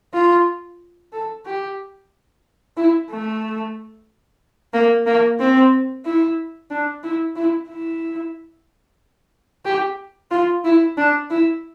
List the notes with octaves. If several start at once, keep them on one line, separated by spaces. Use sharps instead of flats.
F4
A4
G4
E4
A3
A#3
A#3
C4
E4
D4
E4
E4
E4
G4
F4
E4
D4
E4